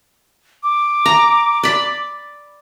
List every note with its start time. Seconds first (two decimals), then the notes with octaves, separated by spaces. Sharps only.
0.63 D6
1.06 A#5
1.63 D5 B5